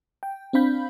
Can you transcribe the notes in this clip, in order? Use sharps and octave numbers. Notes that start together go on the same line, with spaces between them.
G5
C4 D4 F5 B5 G6